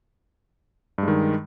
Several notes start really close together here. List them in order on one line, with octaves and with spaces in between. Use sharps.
G2 G#3 D#3